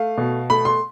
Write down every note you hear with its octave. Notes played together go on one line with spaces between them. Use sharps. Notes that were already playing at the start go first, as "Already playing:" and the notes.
Already playing: A3 F5
B2
A3 B5
C6